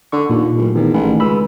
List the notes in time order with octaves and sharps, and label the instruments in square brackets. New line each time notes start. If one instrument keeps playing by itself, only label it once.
[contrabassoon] D3 [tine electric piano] C#6
[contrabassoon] D#2 [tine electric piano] A#2
[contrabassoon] D1
[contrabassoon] E2 [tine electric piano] D#3
[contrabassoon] A1
[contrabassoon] C#2 [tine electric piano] B5 E6